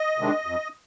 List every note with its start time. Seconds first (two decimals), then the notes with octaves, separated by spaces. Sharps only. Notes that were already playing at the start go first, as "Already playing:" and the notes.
Already playing: D#5
0.18 C3 D#3 G#3 D4
0.46 F2